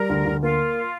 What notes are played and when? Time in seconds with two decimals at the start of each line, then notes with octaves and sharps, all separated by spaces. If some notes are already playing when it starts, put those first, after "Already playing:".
Already playing: G3 A#4
0.10 D2
0.26 D2
0.43 A#3 F4